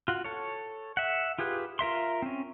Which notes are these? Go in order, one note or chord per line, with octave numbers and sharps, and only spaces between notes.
F4 F#4
A4 C#5
E5 F#5
F4 G4 G#4 B4
F4 A#4 E5 C6
C4 C#4